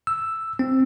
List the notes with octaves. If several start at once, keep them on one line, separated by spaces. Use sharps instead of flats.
E6
C4